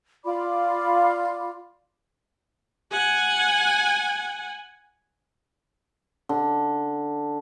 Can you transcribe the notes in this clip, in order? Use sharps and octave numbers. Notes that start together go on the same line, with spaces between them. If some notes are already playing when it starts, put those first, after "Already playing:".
F4 D5 B5 D6
F#5 G#5
D3